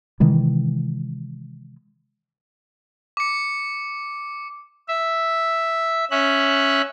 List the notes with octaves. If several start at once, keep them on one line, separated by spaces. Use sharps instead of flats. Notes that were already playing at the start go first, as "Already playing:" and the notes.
C3 D#3 E3 G#3
D6 C#7
E5
C#4 E5 F#6